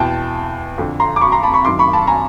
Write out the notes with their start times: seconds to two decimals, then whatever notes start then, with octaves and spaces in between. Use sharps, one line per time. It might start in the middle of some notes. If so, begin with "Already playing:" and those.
Already playing: E2 B2 G5 A5
0.78 F2 D3
1.00 A#5 C6
1.16 D6
1.21 B5 C#6
1.32 A#5 C6
1.43 A5 B5
1.54 B5 C#6
1.65 F#2 D#3 C6 D6
1.79 B5 C#6
1.93 A5 B5
2.07 G#5 A#5